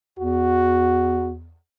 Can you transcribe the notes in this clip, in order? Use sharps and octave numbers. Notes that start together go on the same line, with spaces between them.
E2 F#4